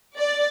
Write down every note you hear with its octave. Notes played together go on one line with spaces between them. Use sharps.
D5